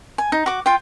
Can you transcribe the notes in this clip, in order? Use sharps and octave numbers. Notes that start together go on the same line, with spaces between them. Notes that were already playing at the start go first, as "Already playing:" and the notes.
G#5
D#4
F#4 D6
F4 G5